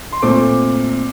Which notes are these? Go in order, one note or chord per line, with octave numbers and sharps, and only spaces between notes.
C6
A#2 A3 C4 D6